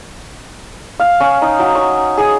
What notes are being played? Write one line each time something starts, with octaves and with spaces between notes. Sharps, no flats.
F5
C#4
D#4
F#3
C#5
G#4